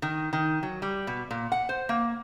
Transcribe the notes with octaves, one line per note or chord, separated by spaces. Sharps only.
D#3
D#3
F#3
G3
B2
A#2
F#5
C5
A#3